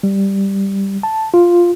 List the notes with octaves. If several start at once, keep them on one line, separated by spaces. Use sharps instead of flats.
G3
A5
F4